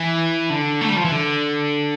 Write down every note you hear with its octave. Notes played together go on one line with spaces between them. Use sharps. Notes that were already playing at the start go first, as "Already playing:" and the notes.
Already playing: E3
D3
A3
G3
F3
E3
D3